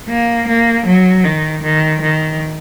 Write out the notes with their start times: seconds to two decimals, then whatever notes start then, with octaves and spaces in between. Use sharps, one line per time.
0.08 A#3
0.47 A#3
0.86 F#3
1.24 D#3
1.63 D#3
2.01 D#3